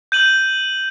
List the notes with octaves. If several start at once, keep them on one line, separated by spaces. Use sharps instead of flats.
G6 D#7 F#7